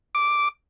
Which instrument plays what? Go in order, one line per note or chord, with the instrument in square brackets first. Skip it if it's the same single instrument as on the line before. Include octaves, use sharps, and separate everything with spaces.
[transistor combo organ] D6